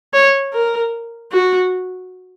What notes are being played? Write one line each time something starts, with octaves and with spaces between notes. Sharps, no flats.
C#5
A#4
F#4